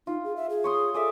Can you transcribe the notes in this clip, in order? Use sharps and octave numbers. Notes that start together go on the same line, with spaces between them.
D#4 F4
G#4
E5
G#4
C#5 C6 D#6
G#4 A4 D5 E5